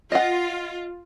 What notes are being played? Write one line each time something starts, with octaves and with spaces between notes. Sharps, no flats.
F4 D#5 F#5